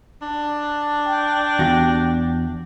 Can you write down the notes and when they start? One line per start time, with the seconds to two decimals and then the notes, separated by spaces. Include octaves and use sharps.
0.22 D4
1.06 G5
1.59 E2 F#4 G4